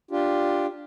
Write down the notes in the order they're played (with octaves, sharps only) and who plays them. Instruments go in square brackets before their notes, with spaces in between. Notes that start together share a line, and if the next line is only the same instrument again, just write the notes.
[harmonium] D4 F4 G4